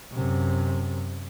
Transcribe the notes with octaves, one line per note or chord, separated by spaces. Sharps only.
F#2 C3